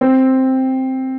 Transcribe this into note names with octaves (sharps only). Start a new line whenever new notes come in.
C4